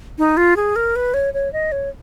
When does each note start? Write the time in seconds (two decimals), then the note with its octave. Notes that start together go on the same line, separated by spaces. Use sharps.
0.18 D#4
0.37 F4
0.56 G#4
0.76 A#4
0.96 B4
1.14 C#5
1.34 C#5
1.53 D#5
1.72 C#5